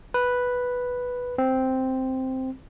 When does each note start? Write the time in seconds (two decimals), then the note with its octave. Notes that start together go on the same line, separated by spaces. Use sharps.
0.14 B4
1.38 C4